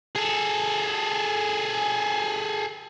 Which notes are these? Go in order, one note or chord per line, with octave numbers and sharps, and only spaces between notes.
G#4 A4